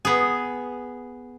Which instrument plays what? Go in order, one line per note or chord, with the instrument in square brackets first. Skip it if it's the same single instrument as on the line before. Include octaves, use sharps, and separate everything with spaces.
[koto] B3 G#4